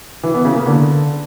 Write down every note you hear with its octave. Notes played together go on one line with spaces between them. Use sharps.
E3
B3
C#3
A#3
D3